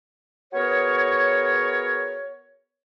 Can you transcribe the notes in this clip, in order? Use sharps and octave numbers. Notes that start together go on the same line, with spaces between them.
B3 F#4 G#4 A#4 C#5